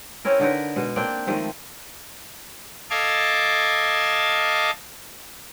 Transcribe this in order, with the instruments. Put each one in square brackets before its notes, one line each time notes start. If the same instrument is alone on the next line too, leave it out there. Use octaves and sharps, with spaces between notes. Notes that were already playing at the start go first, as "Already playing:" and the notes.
[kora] C4 C#4 E4 A#4
D3 D#4 A#4 B4
B2 G#3
A#3 C4 D4 G5
D#3 F3 G#3 A3
[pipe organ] A4 D#5 F5 A5 D6 G#6